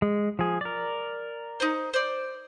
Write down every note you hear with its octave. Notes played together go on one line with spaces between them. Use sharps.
G#3
F3 G#4
A#4 D5
D#4 C5
C5 D5